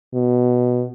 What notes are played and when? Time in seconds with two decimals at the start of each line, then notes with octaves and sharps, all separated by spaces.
0.14 B2